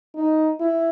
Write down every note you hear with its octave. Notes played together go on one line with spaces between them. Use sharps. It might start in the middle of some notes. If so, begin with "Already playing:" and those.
D#4
E4